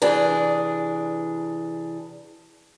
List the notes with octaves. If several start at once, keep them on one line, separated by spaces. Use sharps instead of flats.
C3 E3 D4 G#4